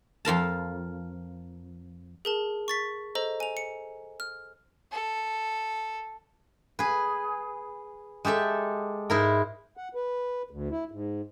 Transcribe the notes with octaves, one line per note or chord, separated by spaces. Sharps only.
F2 F4 A#4 A5
G#4 A#4 A5
C#6 A6 B6
A4 C5 D#5 A#5
G#5 F7
C#7
F6
A4
G#4 B4
G#3 G4 A4 E5
G#2 E4 A#4
F#5
B4
D2
E4
G#2